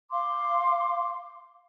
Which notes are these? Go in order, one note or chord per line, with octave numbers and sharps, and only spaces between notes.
F5 C6 D6